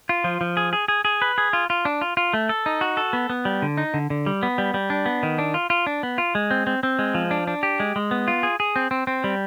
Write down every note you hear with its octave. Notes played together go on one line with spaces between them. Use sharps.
F4
F3
F3
G#4
G#4
G#4
G#4
B4
G#4
F4
F4
D4
F4
F4
A3
A4
D#4
F#4
A4
B3
B3
G3
D3
D#4
D3
D3
G3
B3
G3
G3
D4
B3
D#3
D4
F4
F4
D4
B3
F4
G#3
C4
C4
C4
G#3
F3
D4
D4
G4
G#3
G#3
B3
F4
G#4
G#4
C4
C4
C4
G3